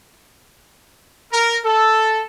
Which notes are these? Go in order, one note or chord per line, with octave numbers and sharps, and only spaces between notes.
A#4
A4